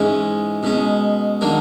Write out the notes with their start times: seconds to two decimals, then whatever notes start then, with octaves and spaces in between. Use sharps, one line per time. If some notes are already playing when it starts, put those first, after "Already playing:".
Already playing: G#2 E3 G#3 C#4
0.63 B2 G#3 C#4
1.41 D#3 F#3 A#3 D4